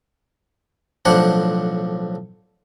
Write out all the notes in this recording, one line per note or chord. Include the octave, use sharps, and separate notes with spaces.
B1 A2 F3 D4 C5 F#5